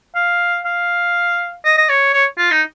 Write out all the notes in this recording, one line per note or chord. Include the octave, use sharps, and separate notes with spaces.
F5
F5
D#5
D#5
C#5
C#5
F4
D#4